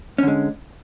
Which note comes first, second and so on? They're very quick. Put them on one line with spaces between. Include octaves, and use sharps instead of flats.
C#4 D3 G#3